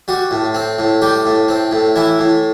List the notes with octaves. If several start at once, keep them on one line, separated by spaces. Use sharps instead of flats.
G3 F#4
A2
C4
A2
G3 G4
A2
C4
A2
E3 E4
A2